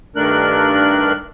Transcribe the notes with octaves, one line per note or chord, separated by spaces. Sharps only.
G2 D#3 A3 D4 A#4 F#6